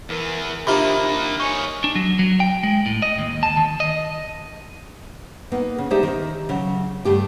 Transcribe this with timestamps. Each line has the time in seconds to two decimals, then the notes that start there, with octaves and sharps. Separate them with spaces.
0.09 E2 E3 A#4
0.67 C3 D#3 A#3 D4 F4 A#5 B5
1.40 D#4 C#5 G#5 C#6
1.84 D4
1.95 F#3
2.19 F#3
2.40 G5
2.63 G#3
2.86 A2
3.02 D#5
3.18 D#2
3.43 A5
3.57 D#3
3.80 D#5
5.52 A#3 B3 D#4
5.78 C#3
5.90 G#3 D#4 G4 C5 D5 E5
6.03 D#3
6.49 C#3 F#3
7.05 G2 A3 G4 G5